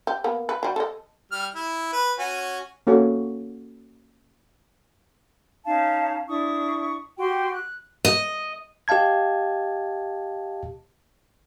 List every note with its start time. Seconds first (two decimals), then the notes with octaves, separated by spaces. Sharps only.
0.07 G4
0.24 A#3 B3
0.49 B4
0.63 F#3 G3
0.76 A4 D#5
1.32 G3 F6
1.55 E4
1.93 B4
2.18 C#4 F#4 G#5
2.87 A#3 C#4 F#4 A4 C#5
5.65 C#4 D#4 F5 A5
6.28 D4 E4 C#6 D#6
7.18 F#4 G4 G5 C6
7.54 F#6
8.05 D#5
8.88 G4 D#5 F5 A5 G#6